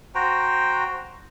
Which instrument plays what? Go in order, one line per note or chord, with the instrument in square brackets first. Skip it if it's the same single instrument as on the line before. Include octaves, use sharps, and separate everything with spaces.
[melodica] F#4 C5 G5 A#5